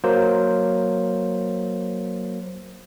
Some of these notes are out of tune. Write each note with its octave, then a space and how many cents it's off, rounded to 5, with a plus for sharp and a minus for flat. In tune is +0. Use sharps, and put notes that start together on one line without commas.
F#3 +0 A#3 +0 C5 +0